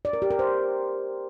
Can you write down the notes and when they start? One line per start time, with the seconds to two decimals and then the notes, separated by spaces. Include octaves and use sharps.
0.05 D5
0.13 A#4
0.22 G4
0.30 A#4
0.39 C5